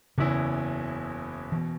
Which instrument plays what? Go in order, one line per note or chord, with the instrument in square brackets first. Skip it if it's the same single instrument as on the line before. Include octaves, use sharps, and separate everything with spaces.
[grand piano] F#1 E2 E3 C#4 E4 [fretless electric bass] C#3
[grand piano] B2 [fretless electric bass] E3